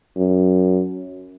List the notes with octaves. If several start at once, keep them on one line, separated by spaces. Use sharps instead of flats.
F#2